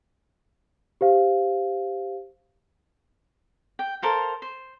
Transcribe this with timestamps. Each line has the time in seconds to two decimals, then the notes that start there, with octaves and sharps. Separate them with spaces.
1.01 G4 C5 F5
3.79 G5
4.02 A4 A#4 C5 F5
4.42 C5